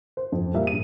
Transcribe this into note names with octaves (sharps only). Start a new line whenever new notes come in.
C5
F2
A#2 G3 A#3 E5
A#1 D#7